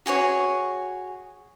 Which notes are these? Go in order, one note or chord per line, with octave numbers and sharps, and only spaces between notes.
F#4 G#4 B4 C#5